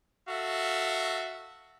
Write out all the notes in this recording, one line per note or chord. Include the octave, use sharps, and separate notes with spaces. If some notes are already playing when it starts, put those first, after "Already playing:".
F#4 A4 E5 F5